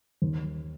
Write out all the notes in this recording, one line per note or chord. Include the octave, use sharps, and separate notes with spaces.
D#2